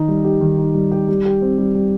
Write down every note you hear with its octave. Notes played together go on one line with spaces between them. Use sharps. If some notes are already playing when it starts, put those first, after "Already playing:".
Already playing: D#3 D#4
G3
G4
D#3
D#4
G3
G4
G3
G4
C4
G3
G3